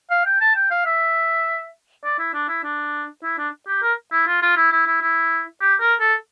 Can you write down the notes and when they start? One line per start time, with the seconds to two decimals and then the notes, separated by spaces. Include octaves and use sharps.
0.11 F5
0.26 G5
0.41 A5
0.56 G5
0.71 F5
0.86 E5
2.04 D5
2.19 E4
2.34 D4
2.49 E4
2.63 D4
3.23 E4
3.38 D4
3.68 G4
3.83 A#4
4.12 E4
4.27 F4
4.42 F4
4.57 E4
4.72 E4
4.87 E4
5.01 E4
5.61 G4
5.81 A#4
6.00 A4